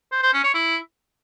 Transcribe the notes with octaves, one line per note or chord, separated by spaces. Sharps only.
C5
C5
C#4
C#5
E4